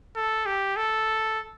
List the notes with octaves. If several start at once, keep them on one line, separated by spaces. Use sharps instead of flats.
A4
G4
A4